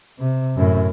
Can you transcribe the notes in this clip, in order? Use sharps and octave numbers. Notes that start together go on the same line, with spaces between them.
C3
F#2 A2